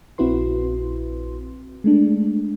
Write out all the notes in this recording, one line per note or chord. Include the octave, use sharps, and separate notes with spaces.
A#1 C4 E4 F#4 B4 C6
G#3 A3 D4